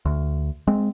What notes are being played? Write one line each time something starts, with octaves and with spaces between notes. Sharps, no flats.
D2
G#3 C4